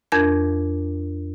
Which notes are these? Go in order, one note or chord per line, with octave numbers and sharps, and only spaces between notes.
F2 D4 A#4 G6 G#6